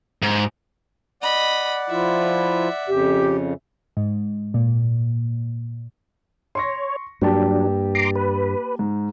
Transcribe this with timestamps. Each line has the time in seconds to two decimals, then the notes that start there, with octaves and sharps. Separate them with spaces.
0.22 G#2
1.22 D5 D#5 F#5 B5
1.90 F3 E4 F4 E5
2.88 F2 C#3 G4
3.97 G#2
4.54 A#2
6.55 C#5 C6 C#6 A#6
7.22 G2 F#3 A#3 D4 G4 A5
7.95 A#5 C6 D6
8.16 B4
8.79 G#2